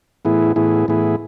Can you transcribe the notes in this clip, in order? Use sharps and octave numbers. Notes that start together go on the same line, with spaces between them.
A2 E3 B3 E4 G#4
A2 E3 B3 E4 G#4
A2 E3 B3 E4 G#4